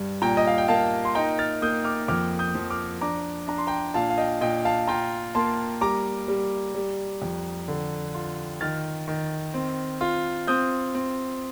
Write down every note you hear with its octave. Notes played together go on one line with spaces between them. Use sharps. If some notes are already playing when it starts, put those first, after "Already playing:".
Already playing: G2
A#2 G5 A#5
D#5
F5
G5
A#3 F5 A5
C6
D#4 G5 A#5
F6 A6
A#3 D#6 G6
D6 F6
F2 D6 F6
D#6 G6
F3
D6 F6
D4 A#5 D6
D4 A#5
C6
G5 A#5
A#2 F5 A5
F5
D#5 G5
A#2 D#5 G5
F5 A5
F4 G5 A#5
A#3 A5 C6
G3 A#5 D6
G3
G3
F2
D3
F4
D#3 F6 A6
D#3
C4
F4
C4 D#6 G6
C4